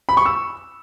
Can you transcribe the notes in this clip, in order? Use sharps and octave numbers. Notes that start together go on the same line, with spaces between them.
B5
C#6
E6